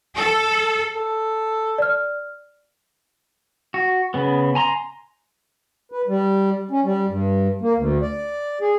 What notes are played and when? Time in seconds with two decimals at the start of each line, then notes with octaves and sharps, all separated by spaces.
0.16 A4
0.96 A4
1.78 D5 F6
3.74 F#4
4.14 C#3 B3
4.55 G#5 A#5 C6
5.92 B4
6.08 G3
6.71 C#4
6.84 G3
7.08 G2
7.61 A#3
7.75 D2
8.02 D5
8.61 G#4